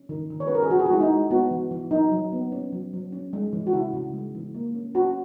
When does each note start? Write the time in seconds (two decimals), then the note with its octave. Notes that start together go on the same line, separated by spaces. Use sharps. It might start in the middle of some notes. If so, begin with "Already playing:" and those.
Already playing: C#4
0.09 D#3
0.30 D#3
0.40 C#5
0.47 C#4 B4
0.55 A#4
0.63 G#4
0.70 E3 F#4
0.79 G#4
0.86 F#4
0.90 G#3 E4
1.01 D#4
1.10 G#3
1.31 B3 F#4
1.51 E3
1.71 E3
1.91 F#3 D#4
2.12 F#3
2.32 B3
2.52 C#4
2.73 F#3
2.93 F#3
3.13 C#4
3.33 G#3
3.53 E3
3.67 F#4
3.73 C#3 E4
3.94 C#3
4.14 G#3
4.35 E3
4.55 A#3
4.75 C#4
4.94 C#4 F#4